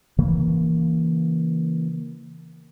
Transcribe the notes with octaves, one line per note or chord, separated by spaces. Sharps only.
C#3 E3 A#3